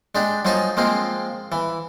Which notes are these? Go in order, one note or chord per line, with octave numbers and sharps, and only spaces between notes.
G#3 D4 G4
F3 F#3 D#4 G#4 G#5 A5
F3 G#3 A#3 C4
E3